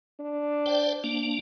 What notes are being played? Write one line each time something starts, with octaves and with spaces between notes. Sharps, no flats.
D4
C5 D5 G5
A#3 D4